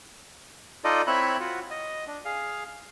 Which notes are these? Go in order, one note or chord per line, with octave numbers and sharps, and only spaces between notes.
D#4 F4 A4 D5 D#5
C4 E4 C#5 E5 B5 F#6
F4 F#4 F#5
D#5
D4
G#4 F5